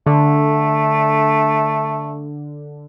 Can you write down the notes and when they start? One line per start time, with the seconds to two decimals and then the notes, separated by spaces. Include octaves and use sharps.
0.06 D3 A3